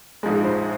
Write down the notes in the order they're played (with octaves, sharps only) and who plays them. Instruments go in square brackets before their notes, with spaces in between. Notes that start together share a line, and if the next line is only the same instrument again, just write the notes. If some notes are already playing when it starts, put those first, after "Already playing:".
[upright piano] A#1 G#2 F3 G#3
C5